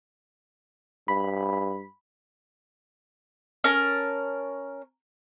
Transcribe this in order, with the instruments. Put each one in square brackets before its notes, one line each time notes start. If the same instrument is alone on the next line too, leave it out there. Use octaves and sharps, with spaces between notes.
[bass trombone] G2 [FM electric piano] B5
[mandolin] C#4 A#4 A5